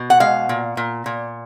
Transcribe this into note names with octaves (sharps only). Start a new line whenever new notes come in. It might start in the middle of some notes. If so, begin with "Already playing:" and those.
Already playing: B2
F#5
G#3 F5
A#2
A#2
A#2